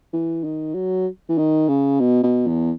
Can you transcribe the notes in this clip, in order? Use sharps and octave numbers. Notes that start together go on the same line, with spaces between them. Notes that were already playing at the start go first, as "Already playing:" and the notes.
E3
D#3
F#3
E3
D#3
C#3
B2
B2
E2